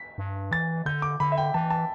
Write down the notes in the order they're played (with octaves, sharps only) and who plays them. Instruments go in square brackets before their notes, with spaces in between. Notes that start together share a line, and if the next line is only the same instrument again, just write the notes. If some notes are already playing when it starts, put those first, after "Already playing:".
Already playing: [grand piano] B6
[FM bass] G2
[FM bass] E3 [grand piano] A6
[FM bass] D3 [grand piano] G6
[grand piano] D6
[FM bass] D3 [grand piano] B5
[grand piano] E5
G5
[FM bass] E3 [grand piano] A5
[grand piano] A5